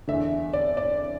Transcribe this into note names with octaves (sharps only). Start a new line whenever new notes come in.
E2 D3 E5
D5
D5